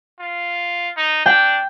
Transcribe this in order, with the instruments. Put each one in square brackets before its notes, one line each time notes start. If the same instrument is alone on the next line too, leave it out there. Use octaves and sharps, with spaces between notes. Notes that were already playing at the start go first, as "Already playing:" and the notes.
[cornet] F4
D#4
[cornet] D4 [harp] G5